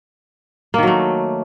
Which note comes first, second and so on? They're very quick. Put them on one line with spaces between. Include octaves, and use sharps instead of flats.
A#3 D#3 F#3 A3